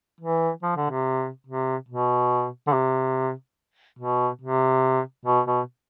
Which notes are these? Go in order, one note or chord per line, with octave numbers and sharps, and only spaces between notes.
E3
F3
D3
C3
C3
B2
D3
C3
B2
C3
B2
B2